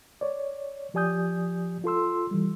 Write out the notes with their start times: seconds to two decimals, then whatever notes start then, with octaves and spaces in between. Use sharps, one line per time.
0.21 C#5 D5
0.94 F3 G4 D5 G#5 D#6 G6
1.84 F4 A4 C6 E6
2.31 E3 G3